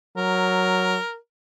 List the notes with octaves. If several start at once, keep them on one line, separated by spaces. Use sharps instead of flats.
F#3 A#4